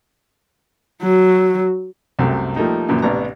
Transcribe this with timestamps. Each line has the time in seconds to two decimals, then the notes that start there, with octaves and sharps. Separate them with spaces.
1.03 F#3
2.19 C2 F#2 A3 C4
2.56 F3 G3 A3 A#3 D#4
2.89 F#2 A#2 C#3 E3
3.02 A1 C3 B3 D4 A#5